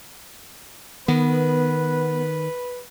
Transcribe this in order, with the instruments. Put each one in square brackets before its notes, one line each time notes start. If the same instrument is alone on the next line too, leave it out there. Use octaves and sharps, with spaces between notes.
[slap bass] D#3 [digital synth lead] B3 [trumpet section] B4